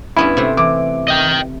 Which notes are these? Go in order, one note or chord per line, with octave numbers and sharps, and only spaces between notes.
G2 B3 C#4 E4
C3 A3
E3 D6
D#5 G5